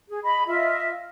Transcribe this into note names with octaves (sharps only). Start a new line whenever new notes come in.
G#4
D#5 B5
F4 D#5 E5